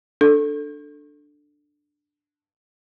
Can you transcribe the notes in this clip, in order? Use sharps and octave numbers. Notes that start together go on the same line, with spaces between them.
D4 A4